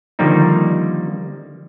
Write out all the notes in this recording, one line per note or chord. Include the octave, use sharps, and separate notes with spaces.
D3 D#3 F3 G3 A#3 D#4